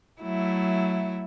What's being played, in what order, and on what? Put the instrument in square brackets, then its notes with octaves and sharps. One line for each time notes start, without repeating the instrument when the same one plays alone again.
[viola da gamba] F#3 A3 E4